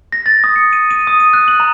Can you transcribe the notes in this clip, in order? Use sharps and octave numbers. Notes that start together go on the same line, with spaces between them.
A#6
A6
D#6
C#7
D#7
D#7
D#6
D#7
F#6
F#7
A#5